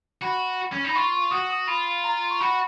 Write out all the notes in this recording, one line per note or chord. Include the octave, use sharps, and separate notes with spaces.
F#4 B5
C#4
D#4 B5
F4 C#6
C#6
F#4 D#6
D#6
F4 B5
A#5
C#6
F#4 B5